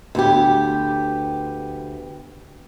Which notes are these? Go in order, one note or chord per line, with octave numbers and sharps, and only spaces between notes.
D2 B3 G4